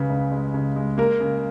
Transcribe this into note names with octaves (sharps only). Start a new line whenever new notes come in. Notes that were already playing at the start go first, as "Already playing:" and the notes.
Already playing: C#2 C#3 B4
C#2
G#3
C#3
G#3
A#3 A#4
C#3